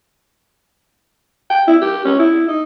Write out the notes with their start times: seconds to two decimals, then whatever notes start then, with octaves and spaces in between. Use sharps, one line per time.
1.50 G5
1.67 E4
1.81 G4
2.05 C#4
2.19 E4
2.48 D#4